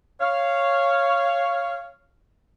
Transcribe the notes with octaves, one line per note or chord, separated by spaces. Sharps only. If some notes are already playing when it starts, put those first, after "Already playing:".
C#5 F5